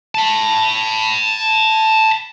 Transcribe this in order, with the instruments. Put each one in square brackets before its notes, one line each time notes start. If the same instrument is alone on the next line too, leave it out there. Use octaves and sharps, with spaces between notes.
[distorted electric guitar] A5 B5